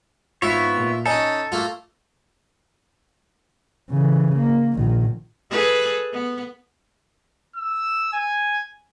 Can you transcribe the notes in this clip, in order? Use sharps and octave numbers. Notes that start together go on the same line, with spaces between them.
G#1 B3 E4 F4 C#5 E5
A#2
C#4 D#4 A4 D#5 G#5
A3 A#3 F4
C#3 E3
A#3
A#1 D#3
G#4 A4 B4
B3
E6
G#5